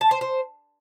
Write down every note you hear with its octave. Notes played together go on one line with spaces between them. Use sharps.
A5
C5
C5